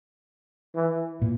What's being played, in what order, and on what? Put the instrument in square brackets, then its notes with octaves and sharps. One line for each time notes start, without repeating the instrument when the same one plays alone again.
[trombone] E3
[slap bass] A#2